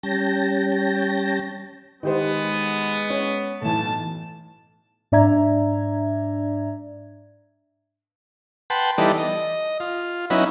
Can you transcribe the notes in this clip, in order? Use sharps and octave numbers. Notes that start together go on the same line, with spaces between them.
G3 C#4 G5 A5 A#6
D#3 G#3 B3 G4 C5
C#4
B1 A2 E3 A5
G#2 D4 D5 E5 A#5 G#6
B4 F#5 G5 A5 C6
E3 G3 B3 D#4 A4 D5
D#5
F4
F#3 B3 C#4 D#4 E4